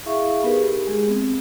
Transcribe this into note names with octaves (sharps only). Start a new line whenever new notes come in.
E4 G#4 E5 F5 C#6
B3 D#4 G4 G#4 A#4 B4
G4
G#3 G#4
B3 C4